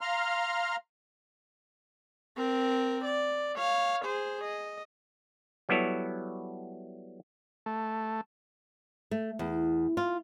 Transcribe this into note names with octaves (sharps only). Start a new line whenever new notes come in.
F5 A#5 C6 F6
C4 A#4
D5
C#5 F5
G#4 C5
D#5
F#3 G3 B3 E4 A4 C#5
A3
A3
E2
F4